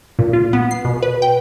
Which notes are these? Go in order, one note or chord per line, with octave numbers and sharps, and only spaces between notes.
A#2
F4
B3
C7
B2
B4
G5